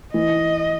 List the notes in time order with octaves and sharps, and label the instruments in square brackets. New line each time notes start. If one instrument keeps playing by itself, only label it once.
[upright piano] E3 [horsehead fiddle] D#5